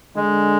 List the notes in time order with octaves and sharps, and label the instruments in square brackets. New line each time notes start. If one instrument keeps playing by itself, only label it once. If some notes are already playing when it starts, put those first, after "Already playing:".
[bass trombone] D3 [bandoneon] G#3